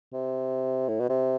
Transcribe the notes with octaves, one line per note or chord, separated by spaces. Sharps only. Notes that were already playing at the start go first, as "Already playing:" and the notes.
C3
A2
B2
C3